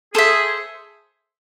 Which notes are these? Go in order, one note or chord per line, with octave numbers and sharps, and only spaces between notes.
G#4 A4 C5 E5